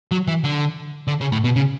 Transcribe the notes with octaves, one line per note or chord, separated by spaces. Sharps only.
F#3
E3
D3
D3
C#3
A2
B2
C#3